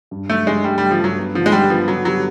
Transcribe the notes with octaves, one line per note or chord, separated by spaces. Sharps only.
G2
F#3 A3
G2 G#3
G3 A3
G3 A3
F3
G2 F#3
B3
D3 F3
G#3
G3 B3
F3 B3
D3 F#3
F#3 G3